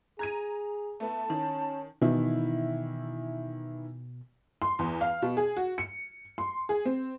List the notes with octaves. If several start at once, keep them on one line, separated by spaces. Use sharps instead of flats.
G#4 A#5 G#6 D#7
A3 B3 A5
D#3 C#4
B2 D#3 E3 E4
C6
E2
F5
B2
G#4
F#4
C#7
C6
G#4
C4